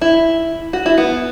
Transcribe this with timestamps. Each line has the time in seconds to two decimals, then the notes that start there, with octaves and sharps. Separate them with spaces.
0.02 E4
0.73 F#4
0.86 E4
0.98 B3